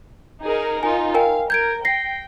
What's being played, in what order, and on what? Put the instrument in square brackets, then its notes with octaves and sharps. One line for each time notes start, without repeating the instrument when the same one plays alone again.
[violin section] D#4 G#4 A#4
[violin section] D#4 F4 [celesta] G#5
[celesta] A#4 G5 G#5 [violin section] F5
[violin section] A#4 [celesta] G6 G#6 D7
[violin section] G5 [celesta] A#6 C7